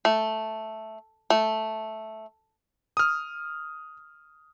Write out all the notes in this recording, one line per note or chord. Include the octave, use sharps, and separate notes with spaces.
A3
A3
D#6 F6